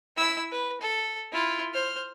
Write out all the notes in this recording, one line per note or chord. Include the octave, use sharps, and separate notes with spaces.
E4 E6
B4
A4
E4 F4
C5 F6